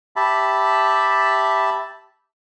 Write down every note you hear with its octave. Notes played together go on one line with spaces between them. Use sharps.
G4 E5 A5 B5